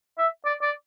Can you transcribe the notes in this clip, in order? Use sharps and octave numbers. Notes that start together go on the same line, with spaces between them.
E5
D5
D5